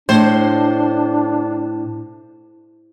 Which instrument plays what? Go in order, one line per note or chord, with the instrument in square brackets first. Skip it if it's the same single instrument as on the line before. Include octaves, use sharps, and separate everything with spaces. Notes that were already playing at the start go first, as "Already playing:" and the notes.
[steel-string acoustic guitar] A2 [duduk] D4 [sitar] C5